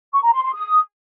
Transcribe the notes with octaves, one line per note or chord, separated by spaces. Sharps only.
C#6
A#5
C6
C6
D#6